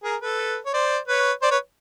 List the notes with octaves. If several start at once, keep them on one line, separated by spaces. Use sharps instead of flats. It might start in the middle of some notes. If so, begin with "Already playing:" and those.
G#4 A#4
A4 B4
C#5
C5 D5
B4 C#5
C5 D5
B4 C#5